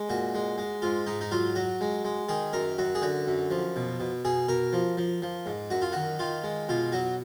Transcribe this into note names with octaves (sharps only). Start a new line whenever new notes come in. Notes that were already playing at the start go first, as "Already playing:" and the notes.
Already playing: G#3
A#2 F#4
G#3
G#3
G#2 F4
G#2 D#4
D#4
F#3 F4
F#3 F#4
G#3
G#3
D#3 G#4
F#2 A#4
F#2 F#4
G#4
D3 F#4
F#2
F3
B2
B2
B2 G#4
B2 A#4
F3
F3
F3
G#2
F#2 F#4
F4
D#3 F#4
D#3 F4
G#3
B2 F4
F#3 F#4